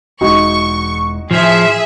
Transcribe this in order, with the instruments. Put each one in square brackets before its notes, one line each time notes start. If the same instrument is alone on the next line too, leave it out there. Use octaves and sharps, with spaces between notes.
[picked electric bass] E1 G#3 [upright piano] D#4 F#4 [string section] C#6
[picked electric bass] A2 [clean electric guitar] F3 [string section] G#4 E5